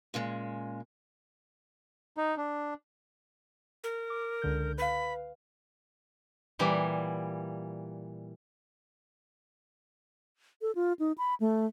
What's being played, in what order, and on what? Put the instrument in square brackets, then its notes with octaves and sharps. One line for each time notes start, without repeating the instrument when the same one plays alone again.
[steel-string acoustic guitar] A#2 C#3 G#3
[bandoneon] D#4
D4
[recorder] A#4
[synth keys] D6
C#2 D3 G6
[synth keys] B4 F5 [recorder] B5
[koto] A#2 E3 G3
[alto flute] A4
F4
D#4
B5
A3